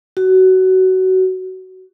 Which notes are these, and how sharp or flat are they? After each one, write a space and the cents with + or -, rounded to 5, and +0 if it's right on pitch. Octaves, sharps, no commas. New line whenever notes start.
F#4 +20